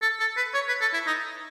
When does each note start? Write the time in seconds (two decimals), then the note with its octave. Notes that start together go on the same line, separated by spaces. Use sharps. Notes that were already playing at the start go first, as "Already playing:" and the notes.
0.02 A4
0.20 A4
0.37 B4
0.54 C#5
0.68 B4
0.81 A4
0.94 E4
1.07 D#4